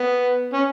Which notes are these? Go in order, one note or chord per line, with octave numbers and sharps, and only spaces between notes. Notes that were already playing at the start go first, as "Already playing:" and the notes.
Already playing: B3
C#4